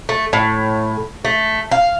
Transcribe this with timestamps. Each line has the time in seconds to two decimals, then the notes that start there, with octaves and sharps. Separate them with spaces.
0.09 A3
0.33 A2
1.25 A3
1.71 F5